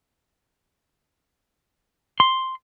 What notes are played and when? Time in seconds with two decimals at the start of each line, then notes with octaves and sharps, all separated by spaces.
2.20 C6